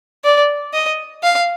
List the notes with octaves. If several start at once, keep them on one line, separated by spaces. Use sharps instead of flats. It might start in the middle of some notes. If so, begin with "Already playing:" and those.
D5
D#5
F5